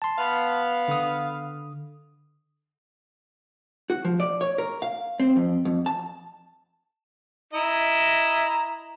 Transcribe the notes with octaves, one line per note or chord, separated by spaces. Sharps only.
A5 C6
B3 F5
D3 D#6
F#4
F3
D5
C#5
A#4
F5
C4
F2
F2
A5
E4 D#5 A#5